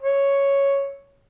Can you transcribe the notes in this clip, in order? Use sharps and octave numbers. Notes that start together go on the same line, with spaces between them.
C#5